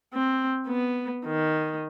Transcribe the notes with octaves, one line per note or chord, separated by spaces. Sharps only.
C4
B3
D#3